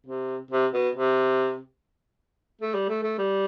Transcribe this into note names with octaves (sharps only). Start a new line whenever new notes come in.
C3
C3
B2
C3
A3
G3
A3
A3
G3